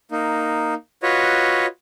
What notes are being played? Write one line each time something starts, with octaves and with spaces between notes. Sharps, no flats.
A#3 D#4
F4 F#4 B4 C#5 D#5